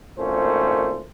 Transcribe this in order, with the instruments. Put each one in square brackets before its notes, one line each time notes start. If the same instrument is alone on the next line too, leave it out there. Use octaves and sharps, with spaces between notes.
[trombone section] G#1 A#2 A3 C#4 C5